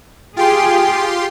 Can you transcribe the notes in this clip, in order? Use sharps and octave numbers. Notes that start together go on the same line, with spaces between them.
F4 G4 G#4 G5 C6